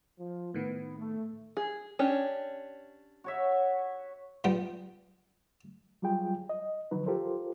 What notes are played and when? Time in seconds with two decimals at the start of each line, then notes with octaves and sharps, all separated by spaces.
0.19 F3
0.54 A2 D#3 B3
0.99 A3
1.57 G#4
1.99 C#4 D4 G4
3.24 F#4 C#5 E5
4.44 B1 G3 B3 F4 G5 A5
6.02 F#3 G3 F4 G#4 G5
6.49 D#5
6.91 D3 D#3 F3 F#3 D#4 B4
7.06 F4 G4 A4 A#4 C5